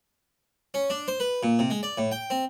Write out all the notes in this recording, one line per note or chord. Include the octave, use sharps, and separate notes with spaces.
C#4
D4
C5
B4
A#2
C3
G#3
D5
A2
G5
C4